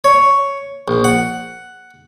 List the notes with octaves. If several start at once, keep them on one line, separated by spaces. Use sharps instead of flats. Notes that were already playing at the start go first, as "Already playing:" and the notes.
C#5
A#1
F#5